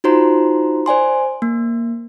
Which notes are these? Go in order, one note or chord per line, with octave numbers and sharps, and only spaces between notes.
D#4 F4 F#4 C5 A#5 C6
C5 D5 G#5 C6
A#3